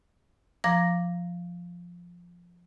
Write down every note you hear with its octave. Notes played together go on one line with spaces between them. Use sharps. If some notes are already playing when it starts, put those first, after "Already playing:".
F3 A#5 D6 A#6